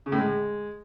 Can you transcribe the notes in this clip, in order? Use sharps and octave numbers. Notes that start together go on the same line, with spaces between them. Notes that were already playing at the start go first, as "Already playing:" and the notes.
C#3
A2
G#3